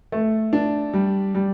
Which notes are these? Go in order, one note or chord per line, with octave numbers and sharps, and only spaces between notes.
A3
D4
G3
G3